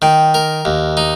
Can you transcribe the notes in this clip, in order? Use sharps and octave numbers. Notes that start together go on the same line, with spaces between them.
D#3 G5
A#4
D#2
D#4